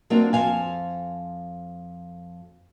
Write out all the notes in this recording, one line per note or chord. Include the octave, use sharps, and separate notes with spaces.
F#3 A#3 C4 D4 F4
F2 C5 F5 G#5